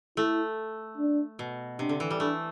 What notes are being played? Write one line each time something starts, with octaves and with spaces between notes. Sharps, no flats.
A3 E4
D4
B2
C3 D4
D3
E3
G3
A3 D4